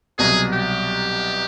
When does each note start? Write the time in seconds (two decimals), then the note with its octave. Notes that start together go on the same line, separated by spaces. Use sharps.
0.18 C2 B2 F#3 G#4
0.53 G4